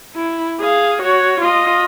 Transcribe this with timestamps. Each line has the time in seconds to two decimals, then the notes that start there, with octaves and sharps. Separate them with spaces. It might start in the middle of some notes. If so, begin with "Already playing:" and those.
0.16 E4
0.60 G#4 F5
1.02 F#4 C#5
1.41 F4 D#5